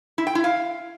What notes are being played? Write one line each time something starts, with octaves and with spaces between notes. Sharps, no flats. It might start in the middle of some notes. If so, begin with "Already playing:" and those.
E4
G5
E4
F5